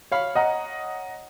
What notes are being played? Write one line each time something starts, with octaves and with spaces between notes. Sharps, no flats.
C#5 F5 B5
D#5 F#5 A#5